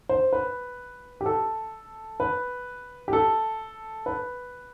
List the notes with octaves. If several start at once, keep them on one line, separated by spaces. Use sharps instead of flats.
C5
B4
G4
A4
B4
G4
A4
B4